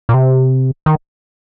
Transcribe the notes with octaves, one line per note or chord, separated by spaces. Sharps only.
A#2
C3
D#3